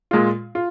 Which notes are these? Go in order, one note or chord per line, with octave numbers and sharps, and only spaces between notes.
A#2 G#3 F4
F4